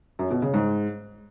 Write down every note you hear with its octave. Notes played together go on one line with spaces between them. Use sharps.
F#2
B2
C#3
G#2